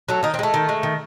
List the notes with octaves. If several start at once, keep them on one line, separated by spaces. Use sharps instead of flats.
F#3 A3
D#3 D#4
C4
G#3 A3
D#3
G#3
D#3